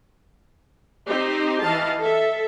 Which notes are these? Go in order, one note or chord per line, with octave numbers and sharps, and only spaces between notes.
C4 D#4 G4 C5
E3 D#5 F5 A5
A4 E5